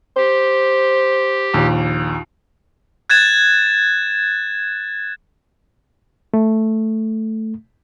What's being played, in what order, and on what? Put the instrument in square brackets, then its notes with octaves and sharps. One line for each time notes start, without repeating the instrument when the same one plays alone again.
[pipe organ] G4 [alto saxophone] C5
[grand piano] A#1 D#2 A#2
[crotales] F#6 G#6 A6 E7
[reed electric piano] A3